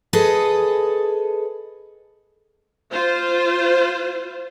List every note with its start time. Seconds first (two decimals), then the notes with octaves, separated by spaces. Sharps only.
0.13 G#4 A4 B4 D#5
2.92 F4 C5